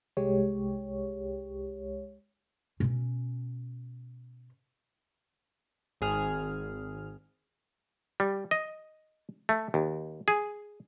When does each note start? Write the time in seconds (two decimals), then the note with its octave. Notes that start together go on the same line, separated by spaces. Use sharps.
0.17 C2 G#3 G4 C#5
2.80 B2 C#4
6.01 G#1 G#4 F6
8.20 G3
8.51 D#5
9.49 A3
9.74 D#2
10.28 G#4